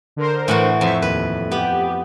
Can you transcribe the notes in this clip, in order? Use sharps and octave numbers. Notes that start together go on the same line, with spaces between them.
D3 A#4 C5
A2 E3 F#4
F2 C5 E5 C#6
D#2 B4
B3 G4